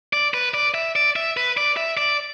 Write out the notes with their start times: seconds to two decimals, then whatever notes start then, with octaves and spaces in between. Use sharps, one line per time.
0.13 D5
0.34 B4
0.54 D5
0.74 E5
0.96 D5
1.16 E5
1.37 B4
1.57 D5
1.77 E5
1.97 D5